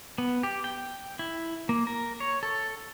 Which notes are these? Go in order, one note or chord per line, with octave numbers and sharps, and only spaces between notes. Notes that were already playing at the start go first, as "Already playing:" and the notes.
B3
G4
G5
E4
A#3
A#4
C#5
A4